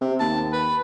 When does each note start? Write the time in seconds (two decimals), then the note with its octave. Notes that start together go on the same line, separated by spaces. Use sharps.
0.01 C3
0.20 D#2 A5
0.53 B4